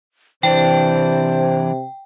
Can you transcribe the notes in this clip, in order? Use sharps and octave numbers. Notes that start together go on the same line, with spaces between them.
C3 E3 D4 C5 G5